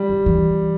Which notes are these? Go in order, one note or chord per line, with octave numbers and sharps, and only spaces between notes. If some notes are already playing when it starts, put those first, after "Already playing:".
Already playing: G3
E3
E3